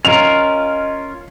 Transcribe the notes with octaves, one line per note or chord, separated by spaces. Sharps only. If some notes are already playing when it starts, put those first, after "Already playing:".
C#4 F4 A#4 C#5 D#5 F7